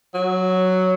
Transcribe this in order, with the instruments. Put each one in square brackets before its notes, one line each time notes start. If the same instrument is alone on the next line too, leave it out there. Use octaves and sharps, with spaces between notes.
[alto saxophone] F#3